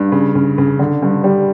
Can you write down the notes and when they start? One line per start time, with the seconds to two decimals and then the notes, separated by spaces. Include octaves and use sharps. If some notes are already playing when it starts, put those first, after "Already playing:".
Already playing: G2
0.12 C#3
0.35 C#3
0.58 C#3
0.79 D3
1.03 G2
1.24 G3